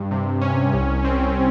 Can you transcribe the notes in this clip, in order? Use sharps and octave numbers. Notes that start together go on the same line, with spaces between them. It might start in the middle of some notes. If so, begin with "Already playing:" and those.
Already playing: G2
C3
C#4
C2
C4